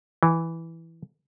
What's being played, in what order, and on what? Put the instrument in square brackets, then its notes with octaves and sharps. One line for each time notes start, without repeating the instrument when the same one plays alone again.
[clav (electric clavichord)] E3